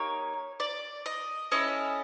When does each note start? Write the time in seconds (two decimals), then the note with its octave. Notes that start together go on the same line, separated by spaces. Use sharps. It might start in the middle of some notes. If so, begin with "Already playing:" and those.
Already playing: A#3 D#4 G4 C#5
0.60 D5
1.06 D#5
1.52 C#4 E4 A4 D#5